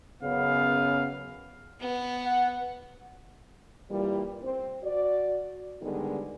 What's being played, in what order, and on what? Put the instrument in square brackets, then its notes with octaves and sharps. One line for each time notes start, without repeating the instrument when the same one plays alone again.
[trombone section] F#2 C#3 B3 [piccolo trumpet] F5
[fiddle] B3
[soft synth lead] F#5
[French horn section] A#2 E3 G3
C4
F#4 D5
D3 D#3 G3 G#3 B3